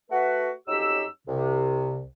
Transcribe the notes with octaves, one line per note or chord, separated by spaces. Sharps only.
A3 F#4 B4
F2 F#3 C#4 D#4 G4 E6
C2 C3